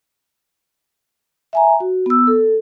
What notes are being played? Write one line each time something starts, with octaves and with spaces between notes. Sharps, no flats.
E5 G#5 A#5
F#4
B3 E6
A4